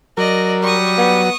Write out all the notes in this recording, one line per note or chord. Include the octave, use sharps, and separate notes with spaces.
F#3 A#4 D5 D#5
G3 C#6 D#6
B3